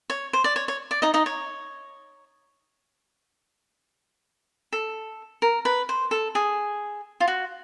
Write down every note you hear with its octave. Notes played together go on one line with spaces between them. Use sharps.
C#5
C5
D5
C#5
C#5
D5
D#4 D#5
D#4 D#5
C#5
A4
A#4
B4
C5
A4
G#4
F4
F#4